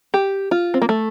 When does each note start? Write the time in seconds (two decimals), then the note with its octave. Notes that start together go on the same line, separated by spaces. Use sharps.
0.14 G4
0.51 F4
0.74 C4
0.82 A#3
0.89 A3